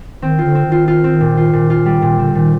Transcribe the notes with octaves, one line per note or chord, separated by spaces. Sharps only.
D#3 C4
F4
D3
C4
D#3
F4
F4
C4
A#2
F4
A#2
F4
G3
A#2
D3 C4
A#2 D#3